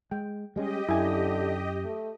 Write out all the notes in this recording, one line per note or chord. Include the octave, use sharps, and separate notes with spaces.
G#3 G5
G3 G#3 C#4 G4 D#5
F#2 D3 E4 G#5
A3